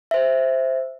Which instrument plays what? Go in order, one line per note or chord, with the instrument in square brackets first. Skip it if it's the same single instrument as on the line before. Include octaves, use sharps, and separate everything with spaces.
[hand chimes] C5 E5